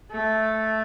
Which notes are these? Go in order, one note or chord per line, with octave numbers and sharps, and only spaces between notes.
A3